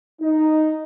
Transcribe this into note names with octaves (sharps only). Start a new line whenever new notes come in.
D#4